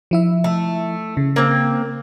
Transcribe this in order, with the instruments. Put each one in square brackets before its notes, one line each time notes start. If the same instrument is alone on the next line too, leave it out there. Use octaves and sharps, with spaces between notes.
[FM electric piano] F3 E4 E5
[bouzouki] A3
[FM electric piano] C#3
[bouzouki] A#3 C4